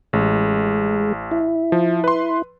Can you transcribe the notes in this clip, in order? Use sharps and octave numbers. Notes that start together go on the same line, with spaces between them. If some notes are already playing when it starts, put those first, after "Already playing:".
A1 G#3
E4
F3
B4 C6